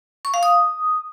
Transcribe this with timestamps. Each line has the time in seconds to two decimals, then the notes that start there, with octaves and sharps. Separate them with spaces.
0.25 C#6
0.34 F5
0.43 D#6